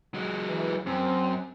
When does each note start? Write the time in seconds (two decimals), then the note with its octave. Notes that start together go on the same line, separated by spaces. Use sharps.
0.14 F#3 G#3
0.49 E3
0.86 F#2 C4